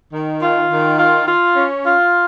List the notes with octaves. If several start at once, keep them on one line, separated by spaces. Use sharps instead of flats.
D#3
F4
D#3
F4
F4
C#4
F4